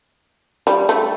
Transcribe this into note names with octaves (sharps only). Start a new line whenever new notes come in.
G3
A3